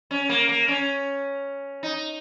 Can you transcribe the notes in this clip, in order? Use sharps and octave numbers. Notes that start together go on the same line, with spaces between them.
C#4
A#3
A#3
C#4
D#4